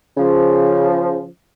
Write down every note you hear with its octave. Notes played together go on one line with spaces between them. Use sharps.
C#3 F3